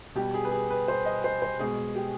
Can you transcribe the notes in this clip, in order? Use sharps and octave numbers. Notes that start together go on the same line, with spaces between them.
B2 G3 G4
G#4
B4
G#4
B4
C5
D#5
C5
C5
B2 G#3 G#4
G4